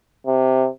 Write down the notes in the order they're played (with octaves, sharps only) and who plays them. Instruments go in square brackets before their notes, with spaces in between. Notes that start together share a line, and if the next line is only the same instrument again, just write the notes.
[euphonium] C3